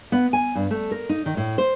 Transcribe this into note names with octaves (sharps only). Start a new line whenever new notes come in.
B3
G#5
G2
A3
A#4
D#4
D#3
A2
C5